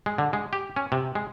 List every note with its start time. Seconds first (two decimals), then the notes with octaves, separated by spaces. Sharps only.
0.06 G#3
0.18 D3
0.33 G#3
0.53 G4
0.76 C#4
0.92 C3
1.15 G#3